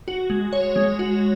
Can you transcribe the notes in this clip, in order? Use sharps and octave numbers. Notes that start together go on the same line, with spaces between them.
F#4
G#3
C#5
G#3
F#4